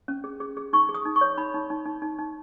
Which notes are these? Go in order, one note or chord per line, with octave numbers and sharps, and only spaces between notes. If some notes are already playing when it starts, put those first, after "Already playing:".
C#4
G#4
G#4
G#4
D#4 C#6
G#4
D#6
D#4
C#6
C#5
D#4 B5
D#4
D#4
D#4
D#4
D#4